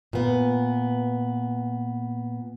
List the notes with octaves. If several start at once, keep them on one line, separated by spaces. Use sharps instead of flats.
A#2 B3